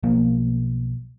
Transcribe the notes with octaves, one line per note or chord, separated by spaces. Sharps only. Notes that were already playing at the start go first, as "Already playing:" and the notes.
B1 F3 A#3